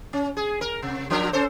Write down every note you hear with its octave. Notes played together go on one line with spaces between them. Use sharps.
C#4
G#4
A#4
C3
F3 D4 A#4
C#4 A4 C5